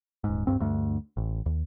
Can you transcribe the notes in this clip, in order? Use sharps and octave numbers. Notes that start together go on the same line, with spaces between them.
D#1 G#2
D1 G#1 G2 C4
D2 G2 A3
A1
D#2